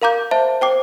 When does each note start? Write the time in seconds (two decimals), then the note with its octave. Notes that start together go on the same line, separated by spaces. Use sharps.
0.02 A#4 F5 A#5 D6 G6
0.31 C5 E5 A5
0.61 C5 G5 D6